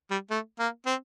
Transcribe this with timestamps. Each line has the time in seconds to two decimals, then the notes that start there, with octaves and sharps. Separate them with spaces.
0.11 G3
0.30 A3
0.59 A#3
0.86 C4